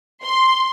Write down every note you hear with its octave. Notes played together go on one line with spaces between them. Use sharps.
C6